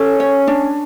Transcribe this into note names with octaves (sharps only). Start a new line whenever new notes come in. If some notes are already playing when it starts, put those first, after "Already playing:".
Already playing: C#4 A4
C#5
D4